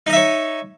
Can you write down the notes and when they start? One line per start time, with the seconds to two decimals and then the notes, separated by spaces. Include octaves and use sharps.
0.07 D#4
0.10 D#5
0.13 E5
0.16 C#5